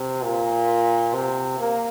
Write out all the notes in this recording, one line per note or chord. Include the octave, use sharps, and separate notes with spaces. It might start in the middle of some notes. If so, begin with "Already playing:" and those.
Already playing: C3
A#2
C3
A#3